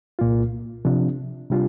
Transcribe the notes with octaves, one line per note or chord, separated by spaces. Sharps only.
C2 A#2 A#3 F4
C3 F3 D4
C3 G3 D4 F4